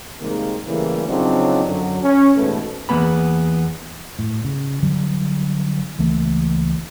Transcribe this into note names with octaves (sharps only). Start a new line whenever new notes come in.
C3 D#3 G3 G#3 A#3
C#3 E3 G3 A3 A#3
C#3 F3 F#3 C4 D4 D#4
F#2 D3 F#3
C#4
A1 E2 G#2 B2 A3 B4
E2 A#3 B3 B5
A2
C#3
D3 F#3 G3
C#2 E3 A3 A#3